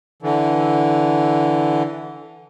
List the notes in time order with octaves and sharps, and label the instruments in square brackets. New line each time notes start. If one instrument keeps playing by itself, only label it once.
[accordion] D3 E3